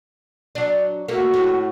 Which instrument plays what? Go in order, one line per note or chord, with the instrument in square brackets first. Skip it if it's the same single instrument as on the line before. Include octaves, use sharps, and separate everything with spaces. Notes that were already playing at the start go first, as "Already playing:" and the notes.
[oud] F#3 D4
[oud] A3 A#3 [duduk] F#4
[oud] A2